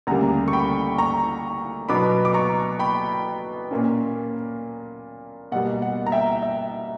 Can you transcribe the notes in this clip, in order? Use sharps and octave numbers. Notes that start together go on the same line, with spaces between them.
D2 C#3 G3 A#3 F#5 A#5
C#6
G5 B5
A#5 C#6
B2 F#3 B3 D4 B5 D6
D6
A#5 C#6
G5 B5
A#2 A#3 C#4
B2 G3 A#3 F#5
F#5
A#5
E5 G5
E5